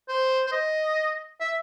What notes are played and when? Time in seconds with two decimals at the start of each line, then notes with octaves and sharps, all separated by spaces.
0.08 C5
0.47 C5
0.52 D#5
1.41 E5